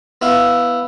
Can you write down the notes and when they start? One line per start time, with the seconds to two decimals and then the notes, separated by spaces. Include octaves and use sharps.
0.21 B3 E4 F5